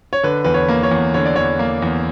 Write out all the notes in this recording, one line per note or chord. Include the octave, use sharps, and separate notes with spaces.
C#5
D3 B4
E2 B4
C#5
A#3
C#5
E2
D3 C#5
D5
E2 C#5
A#3
E2